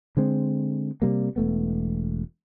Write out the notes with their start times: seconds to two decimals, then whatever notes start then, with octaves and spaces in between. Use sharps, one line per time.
0.17 D3 G#3 C4
1.02 C3 G3 A#3
1.36 E1 A3 B3